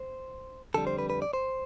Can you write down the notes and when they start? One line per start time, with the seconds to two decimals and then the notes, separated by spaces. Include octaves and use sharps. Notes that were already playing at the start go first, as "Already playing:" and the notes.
Already playing: C5
0.74 F2 D3 G3 A4
0.87 C5
0.98 B4
1.10 B4
1.22 D5
1.33 C5